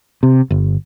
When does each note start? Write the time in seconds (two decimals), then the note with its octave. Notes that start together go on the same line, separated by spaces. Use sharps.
0.23 C3
0.50 G1